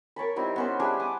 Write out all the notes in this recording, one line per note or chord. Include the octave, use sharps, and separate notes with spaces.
A#4 C#5 A5 B5
G3 C4 D#4 E4
B3 C#4 C5
G3 D4 G#4 E5
D6 D#6